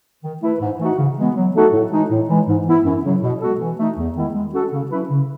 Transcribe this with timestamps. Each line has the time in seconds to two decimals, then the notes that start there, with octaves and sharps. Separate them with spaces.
0.23 D#3
0.42 A3 E4 B4
0.60 G#2
0.79 E3 A3 D#4 F#4
0.98 C#3
1.17 E3 G#3 B3
1.36 F#3
1.55 A3 D#4 F#4 A4
1.72 A2
1.92 E3 G#3 D#4
2.11 A2
2.29 E3 G#3
2.48 G#2
2.67 E3 B3 E4
2.85 F#2
3.04 C#3 F#3
3.23 B2
3.41 G#3 B3 F#4 A4
3.60 E3
3.79 A3 D#4
3.98 E2
4.16 D#3 G#3 B3 E4
4.35 G#3
4.54 C#4 F#4 A4
4.72 C#3
4.91 F#3 C#4 E4 B4
5.09 C#3